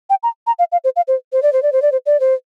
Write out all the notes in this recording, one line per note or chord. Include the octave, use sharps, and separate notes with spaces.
G5
A#5
A#5
F5
F5
C5
F5
C5
C5
D5
C5
D5
C5
D5
C5
D5
C5